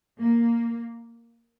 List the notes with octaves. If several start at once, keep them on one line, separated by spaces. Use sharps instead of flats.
A#3